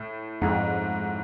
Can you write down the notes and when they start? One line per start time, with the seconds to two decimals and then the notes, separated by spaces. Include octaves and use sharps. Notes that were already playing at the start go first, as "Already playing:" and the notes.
Already playing: A2
0.42 F2 G#2